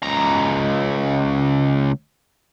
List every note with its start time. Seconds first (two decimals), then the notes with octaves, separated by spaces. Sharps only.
0.03 C#2 A#5